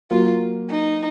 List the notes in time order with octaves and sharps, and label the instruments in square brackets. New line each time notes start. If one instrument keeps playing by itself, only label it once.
[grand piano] F#3 A#3 [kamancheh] F4
[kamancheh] D#4